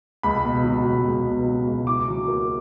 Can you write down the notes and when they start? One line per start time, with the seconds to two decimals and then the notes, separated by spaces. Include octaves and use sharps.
0.23 C#2 B5
0.44 B2
0.64 F#3
0.85 C#2
1.06 C#2
1.26 B2
1.46 F#3
1.67 C#2
1.87 E4 D6
2.08 F#3
2.28 A#3